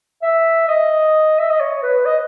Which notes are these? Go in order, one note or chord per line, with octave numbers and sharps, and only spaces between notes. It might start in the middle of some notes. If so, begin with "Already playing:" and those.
E5
D#5
E5
D#5
C#5
B4
D#5